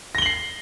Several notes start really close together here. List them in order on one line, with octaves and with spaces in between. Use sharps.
A#6 G7 F#7 C7